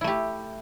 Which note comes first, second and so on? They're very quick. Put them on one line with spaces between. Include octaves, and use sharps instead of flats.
E4 A3 G4